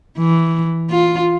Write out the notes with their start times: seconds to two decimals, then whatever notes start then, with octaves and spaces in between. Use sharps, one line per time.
0.18 E3
0.90 F4